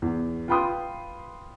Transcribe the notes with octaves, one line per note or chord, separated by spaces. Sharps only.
E2
F4 B4 G5 B5 C6 D#6